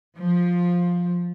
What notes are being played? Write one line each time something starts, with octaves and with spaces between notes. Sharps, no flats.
F3